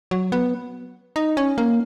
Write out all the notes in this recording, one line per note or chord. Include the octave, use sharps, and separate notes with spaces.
F#3
B3
D#4
C#4
A#3